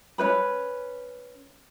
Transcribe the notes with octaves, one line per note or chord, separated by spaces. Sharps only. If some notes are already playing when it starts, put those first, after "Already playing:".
C#4 D#4 B4 B5